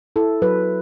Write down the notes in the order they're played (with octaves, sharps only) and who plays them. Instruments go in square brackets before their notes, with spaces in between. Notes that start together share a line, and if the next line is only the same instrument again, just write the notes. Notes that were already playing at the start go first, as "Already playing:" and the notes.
[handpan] E4 A4
F#3 B4